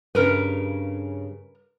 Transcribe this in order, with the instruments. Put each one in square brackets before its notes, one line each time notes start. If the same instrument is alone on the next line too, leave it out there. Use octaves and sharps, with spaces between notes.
[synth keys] G2 C#3 [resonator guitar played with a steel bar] A#4 B4